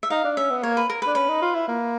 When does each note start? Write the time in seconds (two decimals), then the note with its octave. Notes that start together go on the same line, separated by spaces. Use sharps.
0.03 E5
0.10 D#4 F5
0.25 D4
0.37 C#4 E5
0.50 B3
0.63 A#3 C#5
0.77 B4
0.90 A#4
1.02 B4
1.07 D4
1.15 C#4 B4
1.29 D#4
1.42 F4
1.55 E4
1.68 A#3